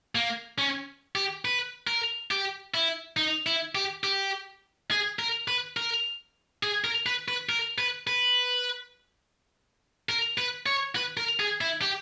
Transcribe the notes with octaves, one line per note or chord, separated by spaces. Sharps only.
A#3
C#4
G4
B4
A#4
G4
E4
D#4
E4
G4
G4
G#4
A#4
B4
A#4
G#4
A#4
B4
B4
A#4
B4
B4
A#4
B4
C#5
B4
A#4
G#4
E4
G4